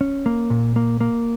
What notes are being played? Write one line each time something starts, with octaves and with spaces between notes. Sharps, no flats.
C#4
A#3
A#2
A#3
A#3